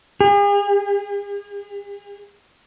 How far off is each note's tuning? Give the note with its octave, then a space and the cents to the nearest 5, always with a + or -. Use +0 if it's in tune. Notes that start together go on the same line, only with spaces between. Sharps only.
G#4 -45